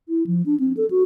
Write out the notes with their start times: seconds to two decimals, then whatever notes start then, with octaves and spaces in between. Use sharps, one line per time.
0.09 E4
0.27 F3
0.46 D4
0.60 C4
0.77 A4
0.91 F#4